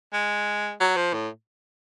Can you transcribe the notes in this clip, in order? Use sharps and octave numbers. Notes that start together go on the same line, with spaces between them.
G#3
F#3
F3
A2